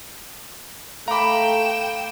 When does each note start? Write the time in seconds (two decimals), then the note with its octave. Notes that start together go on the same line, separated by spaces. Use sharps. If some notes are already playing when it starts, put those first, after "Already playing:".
1.08 A3 F5 G5 A#5 B5 D6 E7